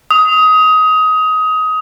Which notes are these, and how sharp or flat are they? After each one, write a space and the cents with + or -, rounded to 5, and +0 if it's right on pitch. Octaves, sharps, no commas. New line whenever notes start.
D#6 +20